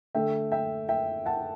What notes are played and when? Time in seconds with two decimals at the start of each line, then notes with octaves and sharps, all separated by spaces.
0.15 D3 A3 E5 G5
0.52 E5 G5
0.89 E5 G5
1.26 F#5 A5